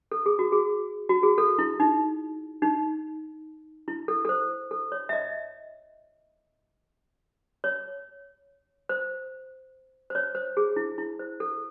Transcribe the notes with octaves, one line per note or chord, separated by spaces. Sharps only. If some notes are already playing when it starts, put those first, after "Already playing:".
A4
G#4
F#4
G#4
F#4
G#4
A4
E4
D#4
D#4
E4
A4
A4
C5
A4
C#5
E5
D#5
C#5
C5
C5
C#5
C5
G#4
E4
E4
C5
A4